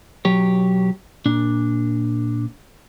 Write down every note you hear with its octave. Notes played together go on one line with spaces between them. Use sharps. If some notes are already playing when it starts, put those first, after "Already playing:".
B1 F#3 G4 C#5
A#2 D4